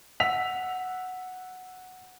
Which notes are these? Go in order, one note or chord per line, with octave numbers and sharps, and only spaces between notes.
F#5 E6 B6 F7